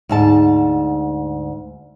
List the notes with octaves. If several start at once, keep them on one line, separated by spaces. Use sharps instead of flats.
D2 G#2 A5